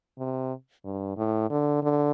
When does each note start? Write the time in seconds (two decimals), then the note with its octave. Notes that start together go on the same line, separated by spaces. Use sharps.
0.18 C3
0.84 G2
1.17 A2
1.50 D3
1.82 D3